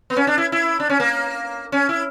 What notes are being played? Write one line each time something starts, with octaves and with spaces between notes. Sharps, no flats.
B3
C#4
D4
E4
E4
D4
C#4
A#3
C#4
E4